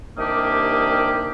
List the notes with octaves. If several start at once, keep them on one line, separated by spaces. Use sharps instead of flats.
C2 D#3 A#3 D4 G4 D#6